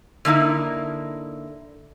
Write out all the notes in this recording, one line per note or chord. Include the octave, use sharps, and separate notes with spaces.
D3 A#3 D#4 E4